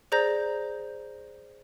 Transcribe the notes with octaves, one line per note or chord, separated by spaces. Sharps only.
G#4 C5 D5 A#5 G6 A#6